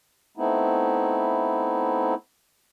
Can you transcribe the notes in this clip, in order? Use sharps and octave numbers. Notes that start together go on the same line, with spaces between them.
A3 B3 C4 D#4 E4